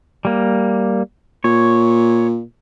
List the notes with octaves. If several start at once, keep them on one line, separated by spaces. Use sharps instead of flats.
G3 A#3
A#2 C#5